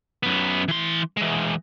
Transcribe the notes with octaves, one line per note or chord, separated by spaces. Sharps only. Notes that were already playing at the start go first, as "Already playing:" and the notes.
F#2 B3
E3 C6
E3 G#3